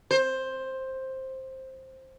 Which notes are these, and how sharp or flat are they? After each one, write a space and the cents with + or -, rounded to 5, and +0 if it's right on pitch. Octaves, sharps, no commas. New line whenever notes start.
C5 +10